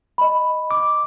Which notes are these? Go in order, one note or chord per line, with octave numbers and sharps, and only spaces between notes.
D#5 B5
D6